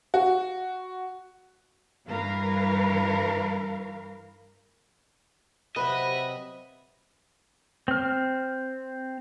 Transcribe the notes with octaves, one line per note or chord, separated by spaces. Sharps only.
F#4
G2 E3 A#4 B4 F5
C3 F#3 C4 B4 D#5 E5 B5
C4 F6